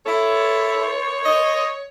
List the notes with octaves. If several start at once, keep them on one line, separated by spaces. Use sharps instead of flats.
E4 A4 C#5
D#5